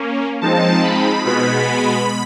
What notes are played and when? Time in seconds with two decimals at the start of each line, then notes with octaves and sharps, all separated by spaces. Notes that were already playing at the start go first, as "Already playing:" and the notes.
Already playing: A#3 C#4
0.41 F3 G#3 C4 D#4 A5
0.83 B5
1.25 B2 G#3 B3 B5